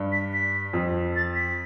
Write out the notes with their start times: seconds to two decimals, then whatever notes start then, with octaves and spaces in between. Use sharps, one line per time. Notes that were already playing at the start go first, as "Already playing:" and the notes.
Already playing: G2
0.12 B6
0.33 B6
0.73 F2
1.16 A6
1.35 B6